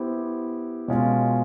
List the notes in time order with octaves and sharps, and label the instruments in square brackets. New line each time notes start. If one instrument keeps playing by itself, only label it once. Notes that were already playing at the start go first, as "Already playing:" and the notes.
Already playing: [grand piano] B3 E4 G4 C5
B2 G#3 C#4 F4